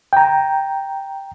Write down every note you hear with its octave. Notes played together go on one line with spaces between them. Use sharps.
G5 A#5